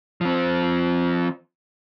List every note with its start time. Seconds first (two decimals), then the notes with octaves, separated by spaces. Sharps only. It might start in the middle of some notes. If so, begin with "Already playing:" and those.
0.21 F3 C4